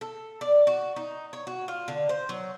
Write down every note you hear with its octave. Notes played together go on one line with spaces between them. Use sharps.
A4
D5
F#4
D#4
C#5
F#4
F4
D3
C5
F#3